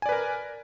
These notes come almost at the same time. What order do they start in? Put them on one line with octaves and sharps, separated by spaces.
G#5 D5 B4 A#4